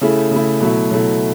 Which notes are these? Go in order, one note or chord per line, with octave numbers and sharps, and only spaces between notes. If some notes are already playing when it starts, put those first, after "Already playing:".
C#3 A3 E4
C#3 A3 E4
B2 F#3 A3 E4
B2 F#3 A3 E4